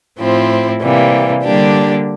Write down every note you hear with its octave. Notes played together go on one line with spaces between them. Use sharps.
A2 F3 C4 E4
C3 E3 G3 A#3
D3 G3 A#3 D4 G4